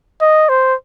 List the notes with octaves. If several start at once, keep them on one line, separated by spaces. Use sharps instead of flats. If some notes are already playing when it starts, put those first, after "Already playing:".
D#5
C5